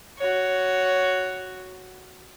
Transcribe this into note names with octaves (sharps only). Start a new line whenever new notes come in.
F#4 C#5